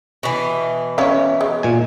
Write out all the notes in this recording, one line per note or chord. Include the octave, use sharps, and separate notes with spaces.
B2 E3
C#4 C#5 E5 F5
G#3
A#2 G#5